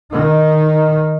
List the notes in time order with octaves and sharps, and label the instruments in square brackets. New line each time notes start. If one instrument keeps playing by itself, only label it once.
[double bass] D#3 D#4